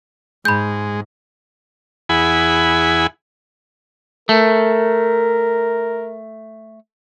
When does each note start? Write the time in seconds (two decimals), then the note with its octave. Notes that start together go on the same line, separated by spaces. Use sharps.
0.45 G#2 G#3 B5 G6
2.09 E2 E4 G#4 F#5 G#5 B5
4.29 A3 A#4